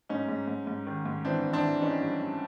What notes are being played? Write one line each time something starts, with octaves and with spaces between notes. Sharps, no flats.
G#2 C#4 D#4
G#2
G#2
G#2
D#3
G#2
E3 C4 D4
E3
C4 D4
E3
E3 C#4 D#4
G2
G2